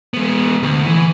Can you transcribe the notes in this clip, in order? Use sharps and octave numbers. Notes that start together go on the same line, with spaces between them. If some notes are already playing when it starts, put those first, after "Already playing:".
G#3 B3
D2
E3